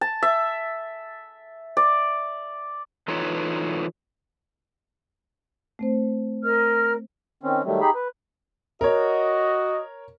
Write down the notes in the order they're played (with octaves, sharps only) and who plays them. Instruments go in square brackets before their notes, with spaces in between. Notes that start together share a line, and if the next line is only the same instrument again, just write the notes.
[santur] A5
E5
D5
[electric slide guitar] E3 D#4 F4 A4 B4 C#5
[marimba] A3 C4 C5
[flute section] A#4 D#5 F6
[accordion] D#3 C4 C#4
D#3 F#3 G3 A3
D#4 G4 G#4 B5
B4
[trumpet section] F#4 D#5 [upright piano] A#4 C#5